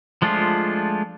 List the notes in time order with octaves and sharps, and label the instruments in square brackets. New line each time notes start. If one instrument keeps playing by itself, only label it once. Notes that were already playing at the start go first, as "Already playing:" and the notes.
[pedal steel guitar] F3 G#3 A3 D4 F4